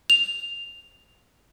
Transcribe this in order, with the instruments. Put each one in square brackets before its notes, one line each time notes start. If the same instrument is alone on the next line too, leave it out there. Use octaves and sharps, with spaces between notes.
[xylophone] F7